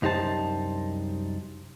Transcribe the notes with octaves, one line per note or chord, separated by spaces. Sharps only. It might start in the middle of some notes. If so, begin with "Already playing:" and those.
C2 F#2 D#4 G4 C5 A5